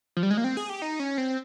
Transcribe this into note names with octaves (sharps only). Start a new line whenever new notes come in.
F3
G3
G#3
A#3
C4
G#4
G4
D#4
C#4
C4